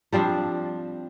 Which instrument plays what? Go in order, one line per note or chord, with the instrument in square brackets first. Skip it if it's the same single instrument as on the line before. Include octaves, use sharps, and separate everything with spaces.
[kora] F3 G3 C4 D4